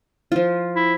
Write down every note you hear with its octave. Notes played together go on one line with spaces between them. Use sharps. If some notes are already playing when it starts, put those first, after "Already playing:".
F3 F4
E4